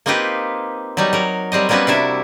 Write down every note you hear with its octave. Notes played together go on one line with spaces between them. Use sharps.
A#3 C4 D#4 F4 G4 B4
F#3 G3 D#4
F#3 A#4
F#3 G3 C4 D#5
G3 A#3 B3 C#4 F#4 B4
C3 D4 E4 E5